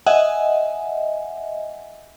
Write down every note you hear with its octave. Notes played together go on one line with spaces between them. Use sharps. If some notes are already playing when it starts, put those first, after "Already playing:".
D#5 E5 F#5 G#5